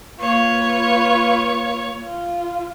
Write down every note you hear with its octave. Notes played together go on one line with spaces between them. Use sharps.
A#3 F4 B4 C#5
F4